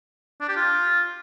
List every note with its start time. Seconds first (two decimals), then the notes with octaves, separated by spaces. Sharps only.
0.41 D4
0.49 G4
0.56 F4